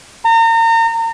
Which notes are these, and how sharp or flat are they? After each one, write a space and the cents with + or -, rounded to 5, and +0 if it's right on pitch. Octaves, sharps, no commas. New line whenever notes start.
A#5 -35